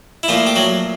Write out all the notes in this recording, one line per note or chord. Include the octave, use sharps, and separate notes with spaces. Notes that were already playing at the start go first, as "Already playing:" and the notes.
E4
A#2 F3 A3 F4
G4
F#3 F#4